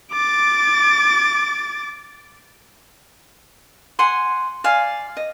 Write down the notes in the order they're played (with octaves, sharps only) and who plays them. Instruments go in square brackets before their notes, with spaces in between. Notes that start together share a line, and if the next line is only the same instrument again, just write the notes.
[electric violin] D6 A6
[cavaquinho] F#5 G#5 C6
D5 F5 G#5
D#5